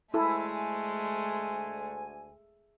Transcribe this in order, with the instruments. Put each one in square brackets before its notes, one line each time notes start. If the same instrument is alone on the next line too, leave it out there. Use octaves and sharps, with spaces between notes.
[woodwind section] D2 G#5 [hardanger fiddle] G#3 A3 [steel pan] E4 A4